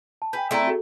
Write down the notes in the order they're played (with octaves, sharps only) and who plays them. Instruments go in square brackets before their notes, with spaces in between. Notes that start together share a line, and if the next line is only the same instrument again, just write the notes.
[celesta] A5
[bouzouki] B4 [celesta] G5 G#5 G6
[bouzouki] A3 C4 E4 [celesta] A4 D5 A#5
[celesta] F#4 G#4 A4